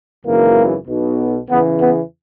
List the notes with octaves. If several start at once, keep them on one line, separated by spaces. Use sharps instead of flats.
G#1 F#2 C#3 E3 A#3
B1 B2
E2 C#3 E3 B3
B3